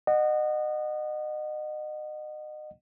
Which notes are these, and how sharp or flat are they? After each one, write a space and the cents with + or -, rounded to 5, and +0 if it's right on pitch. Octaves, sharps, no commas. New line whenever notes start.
D#5 -30 F#5 +0